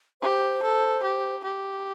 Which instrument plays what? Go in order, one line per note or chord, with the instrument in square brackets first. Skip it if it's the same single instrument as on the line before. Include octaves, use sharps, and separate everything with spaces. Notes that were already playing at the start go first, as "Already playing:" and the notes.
[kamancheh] G4 [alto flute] C5
[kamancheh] A4
G4
G4